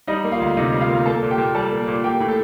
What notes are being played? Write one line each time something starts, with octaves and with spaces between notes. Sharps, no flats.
G3 D#4 D#5
A#3
F4 F5
D2
C3 D#4 D#5
G3
F4 F5
A#3
A#3 A4 A5
A#2
G4 G5
A#2
G3 A4 A5
A#3
A#2
A#3 G4 G5
A2
A4